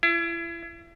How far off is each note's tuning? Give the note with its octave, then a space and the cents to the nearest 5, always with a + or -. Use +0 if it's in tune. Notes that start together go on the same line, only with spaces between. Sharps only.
E4 +35